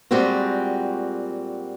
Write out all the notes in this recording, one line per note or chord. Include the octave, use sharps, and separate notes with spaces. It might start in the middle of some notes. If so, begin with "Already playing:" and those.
A#2 G3 G#3 C4 F#4